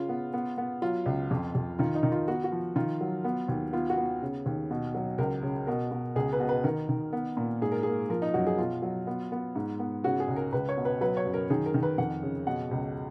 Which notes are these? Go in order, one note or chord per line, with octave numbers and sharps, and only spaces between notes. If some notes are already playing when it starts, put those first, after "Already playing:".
Already playing: C#3 F4
B3
B3
B3
F#3 F4
C#2
F2
F2
D#3 F4
D#4
D#3
F4
B3 F#4
F#4
F3
D#3 F4
F#3
B3
D#2
B3 F4
F#4
B3
C#3
D#2
B2
F#3
C#2 A#4
C#3
B2 A#4
B2
C#2 G#4
B4
B2
B4
D#3 A#4
D#3
B3
A#2
G#2 G#4
A#4
A#3 G#4
F3 A#4
D#4
F#2 F#4
G#4
B2 F4
F#3
B3
B3
G#2
B3
C#3 F#4
G#4
C#2
A#4
C#2 B4
C#5
B2
B4
F#3 B4
C#5
F#2
A#4
D#3 G#4
A#4
D#3
B4
F2 F#5
C#3
B2 F#5
C#2